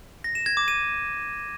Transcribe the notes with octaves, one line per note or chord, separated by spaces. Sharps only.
A#6
E7
G#6
D6
D#7